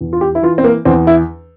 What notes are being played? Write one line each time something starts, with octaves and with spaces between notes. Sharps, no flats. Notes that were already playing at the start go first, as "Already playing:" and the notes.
E2
F4
G4
E4
E3 F4
C4
A#3
E2 C4
E4